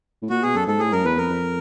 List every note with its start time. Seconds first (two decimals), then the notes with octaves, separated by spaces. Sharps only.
0.22 A2
0.30 A#2 F#4
0.43 B2 G#4
0.55 F#2 A4
0.67 G#2 A4
0.79 A2 G#4
0.92 F#2 A#4
1.05 E2 B4
1.17 F2 A#4
1.30 F2